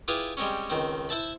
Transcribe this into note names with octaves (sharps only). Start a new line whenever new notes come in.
E4 F4 G4 G#4 B4 F5
G3 G#3 C4 C#4
C#2 D#3 C4
E4 C5 E5 A5 B5